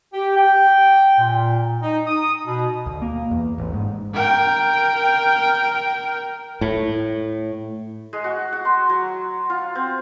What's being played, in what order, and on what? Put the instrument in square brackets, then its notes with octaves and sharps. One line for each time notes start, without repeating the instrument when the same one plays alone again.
[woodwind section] G4
G5
A#2
D#4
D#6
B2
[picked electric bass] D2
A#3
E2
A1
G#2
[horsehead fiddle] A#4 G5
[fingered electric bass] A2
[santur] G#3
F#4
F#4
C6
F#3
F4
C4